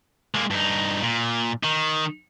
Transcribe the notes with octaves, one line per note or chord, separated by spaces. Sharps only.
G#3 A#3
G2 D#4
A#2
D#3 D#4